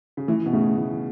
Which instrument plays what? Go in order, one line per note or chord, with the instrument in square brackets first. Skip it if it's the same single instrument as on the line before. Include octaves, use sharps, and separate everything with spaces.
[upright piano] C#3
[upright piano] E3 [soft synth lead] A3
[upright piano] B2
[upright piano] C#3 [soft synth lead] A3
[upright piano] E3